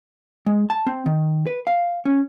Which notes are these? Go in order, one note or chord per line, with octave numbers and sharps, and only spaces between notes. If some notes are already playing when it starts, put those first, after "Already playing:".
G#3
A5
C4
D#3
B4
F5
C#4